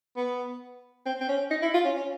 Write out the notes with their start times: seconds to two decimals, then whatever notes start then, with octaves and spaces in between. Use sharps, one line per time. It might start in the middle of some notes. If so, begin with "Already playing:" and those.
0.16 B3
1.06 C4
1.21 C4
1.29 C#4
1.51 D#4
1.62 E4
1.74 F4
1.85 C#4
1.97 C#4